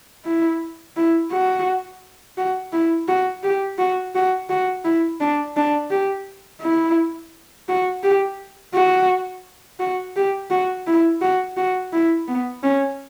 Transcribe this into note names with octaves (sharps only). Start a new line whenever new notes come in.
E4
E4
F#4
F#4
E4
F#4
G4
F#4
F#4
F#4
E4
D4
D4
G4
E4
F#4
G4
F#4
F#4
G4
F#4
E4
F#4
F#4
E4
B3
C#4